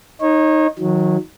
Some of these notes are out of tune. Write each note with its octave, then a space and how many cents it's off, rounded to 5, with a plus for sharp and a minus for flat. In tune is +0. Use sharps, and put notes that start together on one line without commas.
D#4 +0 C#5 -30
D#3 +20 F#3 -20